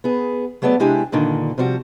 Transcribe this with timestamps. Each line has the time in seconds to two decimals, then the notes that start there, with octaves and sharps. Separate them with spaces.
0.04 B3 G#4
0.62 F#3 A3 B3 G#4 D5
0.80 C3 G#3 D4 E4 G4 G#5
1.12 G2 A#2 D3 D#3
1.58 C3 F3 G3 F#4